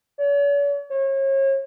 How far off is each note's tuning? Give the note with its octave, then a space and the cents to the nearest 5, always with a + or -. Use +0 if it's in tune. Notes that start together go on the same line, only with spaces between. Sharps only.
C#5 +45
C#5 -35